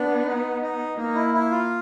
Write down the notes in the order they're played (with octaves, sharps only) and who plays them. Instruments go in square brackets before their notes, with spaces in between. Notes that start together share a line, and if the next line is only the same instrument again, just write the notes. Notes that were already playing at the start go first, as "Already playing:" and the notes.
Already playing: [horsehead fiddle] B3 [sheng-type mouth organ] D4
[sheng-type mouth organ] D#4
D#4
[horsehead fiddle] A#3 [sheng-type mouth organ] D#4
[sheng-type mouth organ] E4
E4
F4